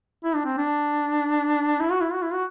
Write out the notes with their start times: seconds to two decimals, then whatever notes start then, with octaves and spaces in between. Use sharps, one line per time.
0.24 E4
0.35 D4
0.45 C4
0.58 D4
1.80 E4
1.92 F#4
2.01 E4
2.13 F#4
2.23 E4
2.33 F#4